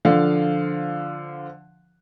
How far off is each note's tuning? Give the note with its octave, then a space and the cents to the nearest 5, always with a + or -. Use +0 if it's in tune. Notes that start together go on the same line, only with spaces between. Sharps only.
D3 +0 F3 +0 F5 +0